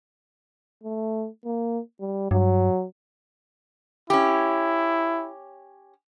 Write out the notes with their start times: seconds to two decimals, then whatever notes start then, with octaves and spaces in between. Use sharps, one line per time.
0.83 A3
1.45 A#3
2.00 G3
2.31 G2 F#3
4.10 C#4 E4 G4